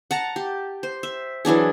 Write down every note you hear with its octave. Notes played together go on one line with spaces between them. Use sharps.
F#5 A5 A#5
G4
C5
E5
E3 F#3 D4 G#4